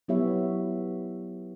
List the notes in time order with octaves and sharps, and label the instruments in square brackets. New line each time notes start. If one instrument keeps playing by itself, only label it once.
[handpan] F#3 B3 E4 G4 C#5 E5